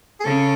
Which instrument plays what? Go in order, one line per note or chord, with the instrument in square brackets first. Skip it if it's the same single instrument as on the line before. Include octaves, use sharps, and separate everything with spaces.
[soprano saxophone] G#4
[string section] C#3 [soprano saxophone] A4